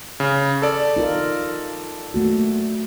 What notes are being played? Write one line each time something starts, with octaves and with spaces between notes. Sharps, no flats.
C#3
A4 D5
D#4 F4 A#4
A3 A#3 F#4